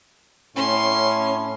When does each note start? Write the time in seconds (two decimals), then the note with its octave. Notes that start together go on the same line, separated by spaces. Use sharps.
0.57 A2 C#4 C6